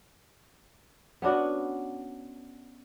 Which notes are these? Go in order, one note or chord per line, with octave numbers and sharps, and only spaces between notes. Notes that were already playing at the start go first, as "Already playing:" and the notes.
B3 C#4 D4 F#4